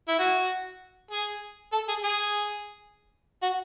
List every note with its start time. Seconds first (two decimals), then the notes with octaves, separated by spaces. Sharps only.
0.08 E4
0.19 F#4
1.11 G#4
1.73 A4
1.88 G#4
2.04 G#4
3.42 F#4